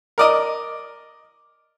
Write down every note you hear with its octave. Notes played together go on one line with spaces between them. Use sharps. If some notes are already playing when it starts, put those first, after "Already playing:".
A#4 D5 D#5